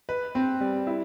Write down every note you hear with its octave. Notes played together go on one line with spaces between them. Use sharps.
B4
C4
G3
E4